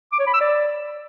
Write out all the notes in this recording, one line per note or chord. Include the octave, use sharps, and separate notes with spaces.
D6
C#5
B5
E6
D5